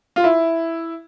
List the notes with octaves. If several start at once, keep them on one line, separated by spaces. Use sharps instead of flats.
F4
E4